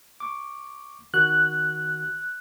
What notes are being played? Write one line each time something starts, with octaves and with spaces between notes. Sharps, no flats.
C#6 D6
D#3 F#4 F#6